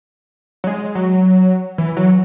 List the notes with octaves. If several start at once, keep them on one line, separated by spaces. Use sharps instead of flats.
F#3
G#3
F#3
E3
F#3